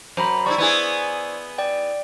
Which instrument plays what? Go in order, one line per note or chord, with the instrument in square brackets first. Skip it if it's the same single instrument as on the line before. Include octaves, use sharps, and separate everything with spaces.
[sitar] F#2 [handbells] C5 A#5 B5
[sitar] G3 D4 E4 [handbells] C5 D5 C#6
[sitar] B3 E4 G#4
[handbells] D5 G5